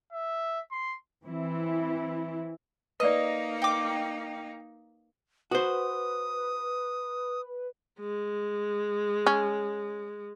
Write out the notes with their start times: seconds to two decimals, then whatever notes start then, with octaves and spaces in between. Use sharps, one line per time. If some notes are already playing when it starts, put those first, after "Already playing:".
0.13 E5
0.71 C6
1.26 E3 C4 E4
3.00 A#3 D#4 B4 D5 D#5
3.62 G5 D6
5.51 F#4 B4 C5 D#6
8.00 G#3
9.26 C#4